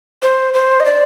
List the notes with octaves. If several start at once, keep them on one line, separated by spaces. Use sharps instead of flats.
C5
C5
D#5
D5